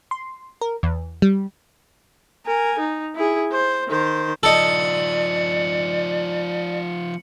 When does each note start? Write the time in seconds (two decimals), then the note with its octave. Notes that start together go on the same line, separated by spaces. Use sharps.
0.11 C6
0.61 A#4
0.83 E2
1.22 G3
2.46 A#4 G#5
2.79 D#4
3.15 E4 G#4
3.52 C5
3.88 D#3 C5
4.43 F3 D#4 A4 D5 D#5 C#7 F#7